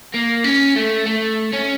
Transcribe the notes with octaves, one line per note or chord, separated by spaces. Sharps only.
A#3
C#4
A3
A3
C#4